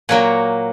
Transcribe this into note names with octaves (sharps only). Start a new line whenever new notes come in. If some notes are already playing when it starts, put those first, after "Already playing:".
A#2 F#3 A#3 F#5